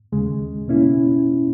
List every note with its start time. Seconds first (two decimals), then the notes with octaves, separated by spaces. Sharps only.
0.12 D#2 C#3 G#3
0.68 B2 A#3 C#4 E4